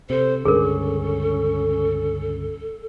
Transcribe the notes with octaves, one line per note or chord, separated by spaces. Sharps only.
C3 A4 C5
C#2 G2 D3 C#4 G#4 A#4